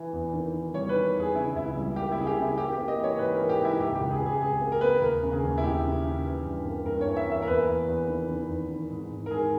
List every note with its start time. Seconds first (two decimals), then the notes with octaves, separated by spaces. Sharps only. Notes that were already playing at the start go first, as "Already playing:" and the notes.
Already playing: E3
0.13 E2
0.33 D#3
0.54 D#3
0.74 G3 C#5
0.89 D#3 B4
1.15 E2
1.20 G#4
1.35 C#3 E4
1.56 C#2 E4
1.76 G3
1.96 A#3 G4
2.12 E4
2.17 C#3 G#4
2.27 G4
2.37 C#3
2.42 E4
2.58 A#3 G4
2.73 G4
2.78 A#3
2.88 D#5
2.98 E3
3.04 C#5
3.18 G#2 B4
3.34 E3 A#4
3.49 G4
3.60 G#2
3.65 E4
3.80 C#2 G4
3.96 G4
4.01 C#2
4.10 G#4
4.20 C#2
4.26 G#4
4.41 C#2 G#4
4.61 A#3
4.72 A#4
4.81 A#3 B4
4.91 A#4
5.02 D#2 A#4
5.23 C#3
5.33 G#4
5.43 D#2
5.58 E4
5.64 D#2 G4
5.84 C#3
6.04 C#3
6.25 E3
6.45 G2
6.66 A#3
6.86 G2 A#4
7.01 C#5
7.06 E3
7.17 E5
7.27 A#3 E5
7.42 A#4
7.47 E2 B4
7.67 E2
7.88 E2
8.08 D#3
8.29 D#3
8.49 E2
8.69 D#3
8.90 G#2
9.10 G#2
9.26 A#4
9.31 G#2 G#4